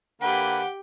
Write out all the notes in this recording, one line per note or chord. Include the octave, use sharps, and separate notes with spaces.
D3 A#3 G4 B4 F#5 G5